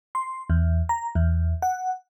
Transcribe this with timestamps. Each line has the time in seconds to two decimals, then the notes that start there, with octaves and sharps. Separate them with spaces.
0.15 C6
0.50 E2
0.89 A#5
1.15 E2
1.62 F#5